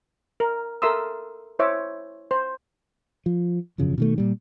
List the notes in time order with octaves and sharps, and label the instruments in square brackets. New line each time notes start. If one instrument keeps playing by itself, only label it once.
[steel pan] A#4
A4 A#4 E5 C6 D#6 E6
E4 C5 C#5 E5 D6
C5
[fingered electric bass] F3
E1 F#2 C#3 F3
B2 D#3 A3
A#2 G3